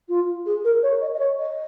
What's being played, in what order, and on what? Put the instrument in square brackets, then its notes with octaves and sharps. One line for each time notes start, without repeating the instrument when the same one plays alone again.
[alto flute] F4
G#4
A#4
C#5
D#5
D#5
C#5
D#5